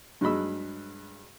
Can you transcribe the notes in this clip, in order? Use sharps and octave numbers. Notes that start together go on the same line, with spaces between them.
G2 F#3 G#3 D#5 B5 E6